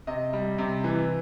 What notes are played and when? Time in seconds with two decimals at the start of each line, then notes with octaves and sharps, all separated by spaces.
0.07 C3 D#5
0.33 G3
0.58 C3
0.84 E3